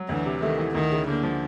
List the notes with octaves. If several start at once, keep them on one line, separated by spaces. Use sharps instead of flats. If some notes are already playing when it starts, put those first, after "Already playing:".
Already playing: F#3
D2 D3 E3
C3
D#3 A3
E3
D2 D#3
C#3
D3 A#3
F3